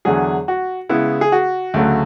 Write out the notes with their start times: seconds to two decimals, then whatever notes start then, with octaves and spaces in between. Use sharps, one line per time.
0.05 E2 D3 F#3 G#4
0.48 F#4
0.89 C#3 G#3 B3 E4
1.21 G#4
1.32 F#4
1.74 D2 C#3 F#3 A3